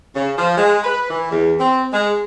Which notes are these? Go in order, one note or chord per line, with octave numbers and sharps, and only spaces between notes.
C#3
F3
G#3
B4
E3
E2
C4
G#3